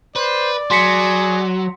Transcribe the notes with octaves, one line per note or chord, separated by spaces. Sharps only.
B4 C5 D5
F#3 G#4 C6 B6 C#7